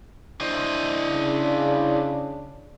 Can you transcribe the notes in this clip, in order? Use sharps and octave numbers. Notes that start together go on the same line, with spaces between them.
D4 E4 C5 D#5
C#3